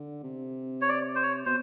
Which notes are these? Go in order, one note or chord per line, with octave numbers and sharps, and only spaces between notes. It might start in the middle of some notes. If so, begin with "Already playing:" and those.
Already playing: D3
C3
C#5
D5
C5
C#5
B2 C5